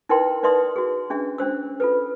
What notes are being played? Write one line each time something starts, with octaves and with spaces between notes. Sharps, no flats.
D#4 E4 A#4 B4 G5 C6
D#4 B4 D5 E5 C6 D#6
F#4 G#4
C#4 D4 G#4 E5
C#4 D4 C5 E6
F4 A4 B4